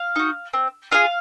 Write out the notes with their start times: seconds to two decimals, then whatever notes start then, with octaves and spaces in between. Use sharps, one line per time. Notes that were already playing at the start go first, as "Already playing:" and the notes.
Already playing: F5
0.16 D#4 F#4
0.53 C4
0.92 F4 G#4 F5